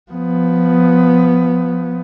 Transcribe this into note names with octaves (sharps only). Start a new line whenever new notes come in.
F3 B3